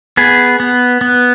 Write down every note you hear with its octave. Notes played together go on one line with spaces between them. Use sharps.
B3 G#4
B3
B3